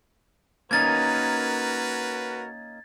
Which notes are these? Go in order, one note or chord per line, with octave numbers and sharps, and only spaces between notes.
A#3 C#4 D#4 F#4 A#4 B4 G#6 A6